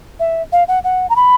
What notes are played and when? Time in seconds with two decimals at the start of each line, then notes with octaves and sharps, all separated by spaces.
0.20 E5
0.52 F5
0.68 F#5
0.84 F#5
1.10 A#5
1.16 B5